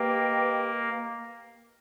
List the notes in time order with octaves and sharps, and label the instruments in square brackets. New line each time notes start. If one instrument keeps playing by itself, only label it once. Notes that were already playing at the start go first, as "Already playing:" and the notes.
Already playing: [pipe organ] A#3 [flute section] G4 B4 D#5 G5